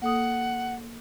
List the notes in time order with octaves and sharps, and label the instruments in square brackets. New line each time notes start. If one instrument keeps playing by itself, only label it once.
[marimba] A#3 A4 D#6 [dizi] F#5